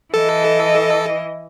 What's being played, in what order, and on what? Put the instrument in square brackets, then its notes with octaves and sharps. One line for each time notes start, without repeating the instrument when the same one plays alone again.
[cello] E3 D#5 [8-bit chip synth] A4